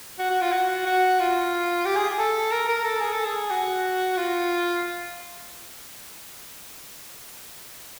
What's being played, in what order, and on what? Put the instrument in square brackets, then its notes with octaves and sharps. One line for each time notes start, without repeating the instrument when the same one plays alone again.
[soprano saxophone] F#4
F#4
F4
F#4
F#4
F4
G4
G#4
A4
A#4
A#4
A4
G#4
A4
G#4
F#4
F4